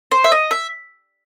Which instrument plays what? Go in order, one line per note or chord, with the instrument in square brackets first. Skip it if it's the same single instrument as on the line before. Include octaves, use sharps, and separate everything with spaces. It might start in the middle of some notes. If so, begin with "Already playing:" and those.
[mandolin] C5
E5
D#5
E5